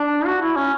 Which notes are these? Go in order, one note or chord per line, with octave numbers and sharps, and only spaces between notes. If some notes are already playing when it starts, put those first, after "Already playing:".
Already playing: D4
F#4
E4
C#4